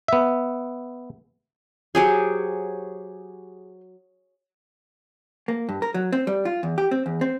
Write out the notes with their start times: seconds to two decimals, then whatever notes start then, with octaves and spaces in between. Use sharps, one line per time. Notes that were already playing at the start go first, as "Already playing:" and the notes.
0.08 B3 E5
1.95 F#3 G4 G#4 C5 C#5 G#5
5.48 A#3
5.69 G2
5.82 A#4
5.94 F#3
6.12 C4
6.27 G3
6.45 F4
6.63 E2
6.78 G4
6.91 C4
7.06 E2
7.21 C4